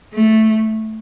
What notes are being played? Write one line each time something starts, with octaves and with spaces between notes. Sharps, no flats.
A3